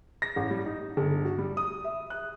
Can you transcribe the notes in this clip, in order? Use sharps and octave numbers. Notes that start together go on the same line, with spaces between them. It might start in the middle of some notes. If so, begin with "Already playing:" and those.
A#6
A1
G3
D#4
G1
F#4
G3
D#6
E5
F#6